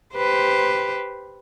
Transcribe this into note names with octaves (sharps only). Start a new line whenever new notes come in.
G4 B4 C5